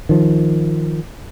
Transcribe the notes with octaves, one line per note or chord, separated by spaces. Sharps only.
D#3 F3